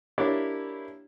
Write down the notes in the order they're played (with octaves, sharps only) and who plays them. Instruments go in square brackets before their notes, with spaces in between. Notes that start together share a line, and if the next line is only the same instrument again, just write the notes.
[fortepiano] A#3 D4 E4 G4 C#5 D5